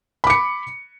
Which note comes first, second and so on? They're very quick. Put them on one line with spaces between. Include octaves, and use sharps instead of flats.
B5 D6 C#7